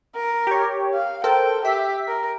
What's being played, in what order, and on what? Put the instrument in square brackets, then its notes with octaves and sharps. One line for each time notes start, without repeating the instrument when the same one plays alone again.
[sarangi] A#4
[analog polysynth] G4 C#5
[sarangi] F5
[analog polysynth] A4 A#4 C5 [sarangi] G5
[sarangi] G4 [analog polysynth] E5 B6
[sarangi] A#4